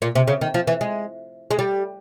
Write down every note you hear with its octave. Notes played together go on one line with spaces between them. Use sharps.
A#2
C3
C#3
D#3
F3
E3
G#3
G#3
G3